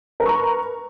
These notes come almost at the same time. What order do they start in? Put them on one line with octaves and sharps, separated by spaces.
A#4 B4 C#6 A#5